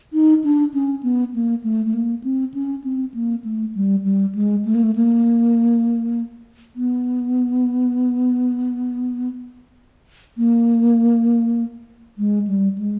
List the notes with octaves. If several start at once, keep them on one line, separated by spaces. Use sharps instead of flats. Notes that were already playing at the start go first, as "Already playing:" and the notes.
D#4
D4
C#4
B3
A#3
A3
A3
A#3
C4
C#4
C4
A#3
A3
G3
G3
G#3
A3
A#3
A3
A#3
B3
A#3
G#3
G3
G#3